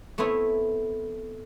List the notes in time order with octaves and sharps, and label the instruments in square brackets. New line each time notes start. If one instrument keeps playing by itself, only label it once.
[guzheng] A3 B3 C4 E4 C#5